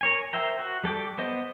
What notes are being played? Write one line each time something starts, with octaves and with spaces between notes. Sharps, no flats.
A#4 C#5 G#5
A#4 C5 E5 G5 A#5
F#4
G3 A4 G5 D6
B3 C5 D#5